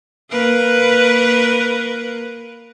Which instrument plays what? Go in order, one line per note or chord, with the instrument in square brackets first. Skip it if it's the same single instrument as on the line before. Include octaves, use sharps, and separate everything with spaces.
[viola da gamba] A#3 A#4 B4